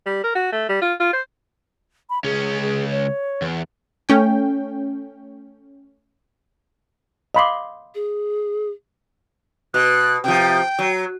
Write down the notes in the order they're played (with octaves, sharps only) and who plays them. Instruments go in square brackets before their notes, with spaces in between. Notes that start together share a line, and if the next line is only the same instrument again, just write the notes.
[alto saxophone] G3
A#4
F#4
A3
G3
F4
F4
C5
[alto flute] B5
[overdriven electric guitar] C#2 C#4 [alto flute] G#4
[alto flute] G#4
C#5
[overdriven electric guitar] E2
[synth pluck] A3 C#4 G5
[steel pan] D#5 B5 C6 [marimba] F5 D6
[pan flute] G#4
[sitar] B2 [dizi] F#6
[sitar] C3 F3 [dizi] G5
[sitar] F#3